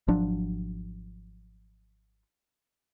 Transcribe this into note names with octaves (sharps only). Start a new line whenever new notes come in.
G#1 F3 F#3 D4